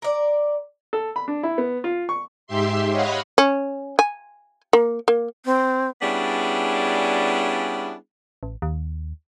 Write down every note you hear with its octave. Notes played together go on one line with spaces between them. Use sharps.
A#4 D5
A4
B5
D4
E4
B3
F4
C#6
G#2 G4 E5 C6
C#5 D#5 F5 F#5 B5
C#4
G#5
A#3
A#3
C4
G3 B3 C#4 D4 E4 G#4
A1
D#2